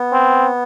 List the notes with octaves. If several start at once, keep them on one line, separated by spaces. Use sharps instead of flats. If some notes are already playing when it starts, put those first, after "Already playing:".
Already playing: B3
C4